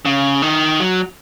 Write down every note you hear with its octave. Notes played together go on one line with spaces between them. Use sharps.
C#3
D#3
F#3